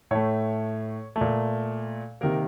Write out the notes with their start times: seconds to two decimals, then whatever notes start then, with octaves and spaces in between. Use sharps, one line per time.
0.11 A2 A3 C#5
1.16 A3
1.21 A#2
2.21 C3 D#3 A#3 A#4